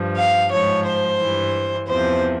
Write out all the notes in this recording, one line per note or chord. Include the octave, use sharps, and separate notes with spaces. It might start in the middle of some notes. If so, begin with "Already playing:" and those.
Already playing: G2 F3
F5
G#2 F3 C#5
C5
G2 E3
E2 C3 F3 C5